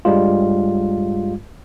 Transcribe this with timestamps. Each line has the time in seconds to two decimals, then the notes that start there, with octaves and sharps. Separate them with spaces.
0.05 G2 G3 G#3 F4